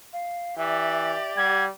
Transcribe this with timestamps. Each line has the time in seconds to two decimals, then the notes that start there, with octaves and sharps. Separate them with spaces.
0.13 F5
0.58 E3 G4 D5 E5
1.37 G3 F#5 G#6